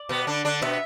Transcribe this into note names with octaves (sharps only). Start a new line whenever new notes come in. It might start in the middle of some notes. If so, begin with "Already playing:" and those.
Already playing: D5
B2 B3
D3 D4
D3 D4
B2 B3 E5